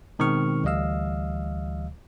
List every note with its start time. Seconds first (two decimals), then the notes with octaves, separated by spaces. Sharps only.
0.19 B2 D#3 G#3 C4 C#6 F6
0.64 D2 E3 G3 D#5 F5 E6